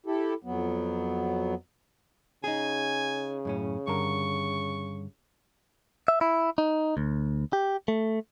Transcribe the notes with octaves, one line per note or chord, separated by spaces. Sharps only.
E4 G4 A4
F2 F#3 B3
C#3 D#4 G#4 G#5
F#2 A2 C#4
G2 D3 A#4 C#6
E5
E4
D#4
D2
G4
A3